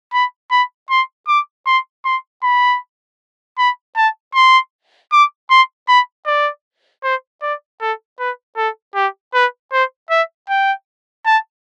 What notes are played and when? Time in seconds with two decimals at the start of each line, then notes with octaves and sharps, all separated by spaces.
0.13 B5
0.51 B5
0.90 C6
1.28 D6
1.66 C6
2.05 C6
2.43 B5
3.58 B5
3.96 A5
4.35 C6
5.12 D6
5.50 C6
5.88 B5
6.27 D5
7.04 C5
7.42 D5
7.81 A4
8.19 B4
8.57 A4
8.95 G4
9.34 B4
9.72 C5
10.11 E5
10.49 G5
11.26 A5